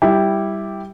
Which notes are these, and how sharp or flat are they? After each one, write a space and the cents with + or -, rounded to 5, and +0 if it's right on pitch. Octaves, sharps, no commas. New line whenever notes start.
G3 +0 E4 -5 G4 +0